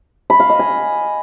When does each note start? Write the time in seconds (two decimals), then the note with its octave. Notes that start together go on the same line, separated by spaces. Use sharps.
0.30 B5
0.40 F5
0.50 D#5
0.59 G#5